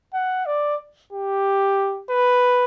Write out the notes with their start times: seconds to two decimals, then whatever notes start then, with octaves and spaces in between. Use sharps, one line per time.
0.14 F#5
0.46 D5
1.13 G4
2.10 B4